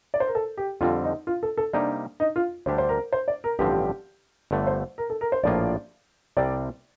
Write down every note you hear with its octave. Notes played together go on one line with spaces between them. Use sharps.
D5
C5
A#4
A4
G4
F2 D3 G3 C4 F4
D#4
F4
A4
A4
C3 G3 A#3 D4 D#4 G4
D#4
F4
D2 D3 G3 D4 G4 C5
C5
A#4
C5
D5
A#4
A1 G2 D3 F3 C4 G4
G1 G2 D3 A3
C5
A#4
A4
A#4
C5
A#1 A2 F3 A#3 F4 D5
C2 C3 G3 C4 D5